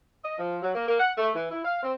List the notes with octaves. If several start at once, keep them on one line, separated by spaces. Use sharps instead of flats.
D#5
F3
F#3
A#3
A#3
F#5
A3
E3
E4
F5
C4